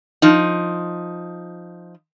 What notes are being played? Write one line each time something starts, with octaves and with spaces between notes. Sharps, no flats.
F3 D#4